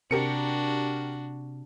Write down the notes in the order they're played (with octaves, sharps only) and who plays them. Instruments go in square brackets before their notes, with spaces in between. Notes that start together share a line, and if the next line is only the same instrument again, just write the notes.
[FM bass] C3 [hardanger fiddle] D4 F#4 [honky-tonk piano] G4 A#4 C#7